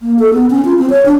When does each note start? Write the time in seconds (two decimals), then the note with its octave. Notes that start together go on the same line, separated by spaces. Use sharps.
0.01 A#3
0.19 A4
0.34 B3
0.50 C#4
0.65 F4
0.79 C4
0.90 C#5
1.06 D4